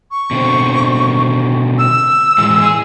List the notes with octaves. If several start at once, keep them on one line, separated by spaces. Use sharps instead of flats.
C#6
B2 D3 C4
E6
A2 E3 G#3
G#4